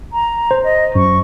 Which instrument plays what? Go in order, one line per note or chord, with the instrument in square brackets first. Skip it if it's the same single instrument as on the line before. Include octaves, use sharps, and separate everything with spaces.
[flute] A#5
[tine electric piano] C5
[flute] D#5
[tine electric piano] F#2 [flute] C#6